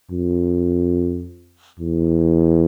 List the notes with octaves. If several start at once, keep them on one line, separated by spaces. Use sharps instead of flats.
F2
E2